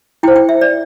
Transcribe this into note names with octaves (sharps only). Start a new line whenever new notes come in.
E4 C5 G5
G5
E5
D5